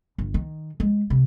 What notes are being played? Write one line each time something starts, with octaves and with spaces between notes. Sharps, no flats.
G1
D#3
G#3
C3